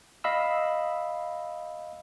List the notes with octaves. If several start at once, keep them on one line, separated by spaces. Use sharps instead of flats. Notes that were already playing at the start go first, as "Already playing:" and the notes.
D#5 F5 B5 E6